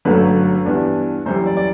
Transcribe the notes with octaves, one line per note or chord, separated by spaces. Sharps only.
G1 F#2 D3 F#3 A3 B4
G2 E3 B3 D4
F#2 E3 G3 C5
D5
D5